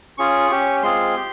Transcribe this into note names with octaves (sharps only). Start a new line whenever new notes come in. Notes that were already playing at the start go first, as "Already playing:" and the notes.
C#4 F4 G#4 C#6
C#4 G4
G#3 C4 F4 G#4 C6
G4